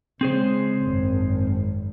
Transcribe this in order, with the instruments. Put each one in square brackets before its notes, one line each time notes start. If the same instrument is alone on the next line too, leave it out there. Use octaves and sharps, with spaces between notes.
[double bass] C#3 G#3 [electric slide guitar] C4 G#4 C5
[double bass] G#1 F#2